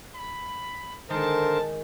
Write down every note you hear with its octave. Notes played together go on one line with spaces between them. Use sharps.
B5
D3 D#3 G#3 A#4 C5 A5